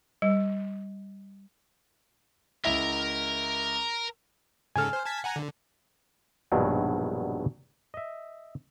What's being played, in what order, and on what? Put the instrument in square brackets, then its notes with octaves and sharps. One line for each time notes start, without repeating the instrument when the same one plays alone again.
[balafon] G3
[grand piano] C#2 E4 E5 [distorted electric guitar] A#4 A#5
[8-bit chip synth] G#2 C#3 A4 [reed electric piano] G#5 F6
[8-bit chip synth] C5
A5 G#6 B6
F#5 G#5 A#5
D3
[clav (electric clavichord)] A#1 G2 B2 D#3 F#3 G#3
D#5 E5